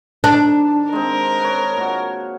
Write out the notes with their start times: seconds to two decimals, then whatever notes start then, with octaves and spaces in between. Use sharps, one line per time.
0.24 D#3 D4
0.93 G#3 C4 A#4
1.40 B4 C#5
1.76 A#2 F#4